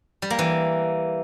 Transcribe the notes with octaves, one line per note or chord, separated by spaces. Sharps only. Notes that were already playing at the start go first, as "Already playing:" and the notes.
G3
A#3
E3